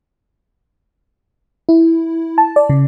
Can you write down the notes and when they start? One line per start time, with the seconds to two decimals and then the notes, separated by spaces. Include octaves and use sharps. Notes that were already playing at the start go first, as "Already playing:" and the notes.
1.69 E4
2.38 A5
2.56 D5
2.70 C#3